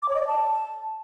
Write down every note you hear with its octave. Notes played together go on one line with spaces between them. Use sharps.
D6
C#5
D#5
D5
A5